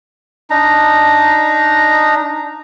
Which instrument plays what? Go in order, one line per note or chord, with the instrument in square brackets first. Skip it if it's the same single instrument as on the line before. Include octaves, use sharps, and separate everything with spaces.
[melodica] D4 D#4 A#5